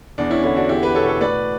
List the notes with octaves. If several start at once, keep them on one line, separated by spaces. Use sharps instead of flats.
E2 D4
C#4 E4
D3 C#4 E4
D4 F#4
E2 E4 G4
G4 B4
B2 A4 C#5
A4 C#5
A2 B4 D5